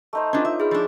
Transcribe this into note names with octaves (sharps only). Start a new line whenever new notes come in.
A3 D#4 C5
C#4 D4 F4 B4
D#4 C#5 D#5 E5
G#4 B5 F6
F3 D4 E4 G#5 C#6